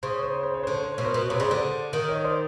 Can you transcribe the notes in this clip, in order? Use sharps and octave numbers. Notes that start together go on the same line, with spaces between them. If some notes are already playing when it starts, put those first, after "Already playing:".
C#3 C5
C#5
C5
C#5
C5
C#5
D3 C5
C#5
C5
B2 C#5
A#4 C5
B2
C3 B4 C#5
C#3 C5 D5
D3 C5 D5
D#3
C#5 D#5
C5 D5